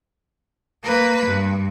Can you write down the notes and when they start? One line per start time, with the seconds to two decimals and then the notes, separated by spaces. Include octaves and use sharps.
0.83 A#3 B4
1.26 G2